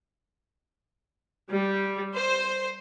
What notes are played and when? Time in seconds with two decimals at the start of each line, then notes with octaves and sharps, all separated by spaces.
1.51 G3
2.15 C5